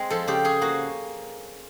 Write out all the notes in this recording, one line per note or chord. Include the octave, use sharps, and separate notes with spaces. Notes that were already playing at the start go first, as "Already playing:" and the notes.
Already playing: G#3 C4
F3 A4
C#3 G4
C#4 G#4
A#3 F#4